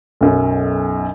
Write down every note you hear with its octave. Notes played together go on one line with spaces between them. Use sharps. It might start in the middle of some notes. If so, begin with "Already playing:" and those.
B1 F#2